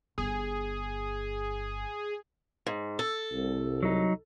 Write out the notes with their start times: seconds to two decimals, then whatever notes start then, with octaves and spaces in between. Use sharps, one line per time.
0.18 G1 G#4
2.66 G#2
2.99 A4
3.32 C2
3.83 F#3 D#4